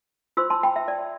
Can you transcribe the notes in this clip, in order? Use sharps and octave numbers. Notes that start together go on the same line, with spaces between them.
F4 C5 C6 E6
A5 C6
G5 B5
E5
D5